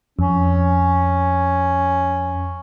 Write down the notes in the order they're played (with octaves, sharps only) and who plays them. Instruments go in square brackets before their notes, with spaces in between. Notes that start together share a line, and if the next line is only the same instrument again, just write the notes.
[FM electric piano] F2 [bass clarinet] C#4